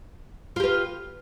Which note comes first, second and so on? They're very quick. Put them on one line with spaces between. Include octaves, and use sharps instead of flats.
F4 G4 B4